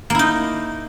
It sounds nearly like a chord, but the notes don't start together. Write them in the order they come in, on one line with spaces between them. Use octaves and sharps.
A#3 E4 D#4